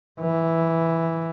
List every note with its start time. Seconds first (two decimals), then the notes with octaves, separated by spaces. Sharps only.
0.20 E3